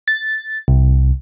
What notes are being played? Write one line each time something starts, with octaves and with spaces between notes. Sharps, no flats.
A6
C2